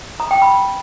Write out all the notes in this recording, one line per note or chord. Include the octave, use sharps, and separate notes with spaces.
A#5
G5
B5